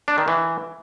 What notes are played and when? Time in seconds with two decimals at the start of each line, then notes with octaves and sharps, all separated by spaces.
0.08 D4
0.18 D#3
0.28 E3